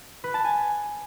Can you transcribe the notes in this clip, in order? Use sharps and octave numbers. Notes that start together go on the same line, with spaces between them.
B4
A5
G#5